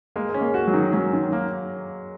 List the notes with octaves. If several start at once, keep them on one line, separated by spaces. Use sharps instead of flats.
G#3 A#3
G#3
C#4
A#3
F#4
F#3
D#3
F#3 C#4
D#3
A#3